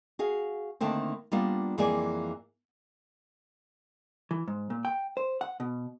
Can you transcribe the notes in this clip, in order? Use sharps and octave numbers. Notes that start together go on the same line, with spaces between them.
F#4 G#4 F5
D3 D#3 A3 A#3 C4
G3 A#3 B3 D4 F4
F2 E3 A#3 G#4 D5 G#5
E3
G#2
A#2
G5
C5
F#5
B2